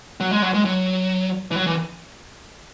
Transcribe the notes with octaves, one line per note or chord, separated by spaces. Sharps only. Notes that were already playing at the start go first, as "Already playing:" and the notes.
F#3
G#3
F#3
G#3
F#3
E3
F#3
E3